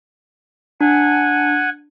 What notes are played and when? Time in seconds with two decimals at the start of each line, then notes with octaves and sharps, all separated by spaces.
0.81 D4 F#5 G#5